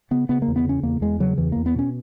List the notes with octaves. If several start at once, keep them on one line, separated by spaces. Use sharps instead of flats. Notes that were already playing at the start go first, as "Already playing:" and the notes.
C#3 B3
C#3 B3
A#3
E2
B3
C#3 C#4
E2 A#3
E2 G#3
C#3 F#3
E2 E3
E2 A#3
B3
B2 C#4